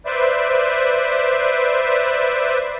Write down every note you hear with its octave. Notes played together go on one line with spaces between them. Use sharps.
B4 C5 D5 E5